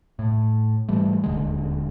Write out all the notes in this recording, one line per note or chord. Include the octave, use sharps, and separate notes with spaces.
A2
G#2 E3 G3 A3
D#1 D2 D3 G#3